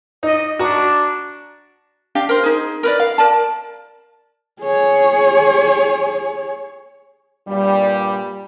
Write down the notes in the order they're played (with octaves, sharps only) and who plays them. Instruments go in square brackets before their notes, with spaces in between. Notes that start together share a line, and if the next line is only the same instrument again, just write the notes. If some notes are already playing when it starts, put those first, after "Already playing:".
[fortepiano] D#4 [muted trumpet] D#5
[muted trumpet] D4 [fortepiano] F#4 A#5
[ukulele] D4 G4 F5
A#4 C5
D#4 G#4
A#4 B4 D5
F5
A#4 D5 A5
[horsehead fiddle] G#4 C#5
[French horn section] G2 A#2 G3